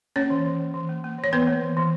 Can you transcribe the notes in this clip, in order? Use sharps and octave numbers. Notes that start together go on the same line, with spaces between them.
A#3 C#4 C#5
E3
E3
A#3
E3
A#3
A#3
E3
C#5
E3 B3 B4
A#3
E3
E3